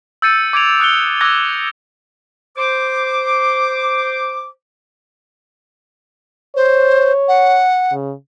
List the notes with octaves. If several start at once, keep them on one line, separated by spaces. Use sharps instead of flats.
E6 G6 A6 C#7 D#7
D6 G#6 D7 F7
D#6 F#6 C#7 G7
D6 E6 F#6 G#6 A#6
C5 D6
C5 C#5
F#5
C#3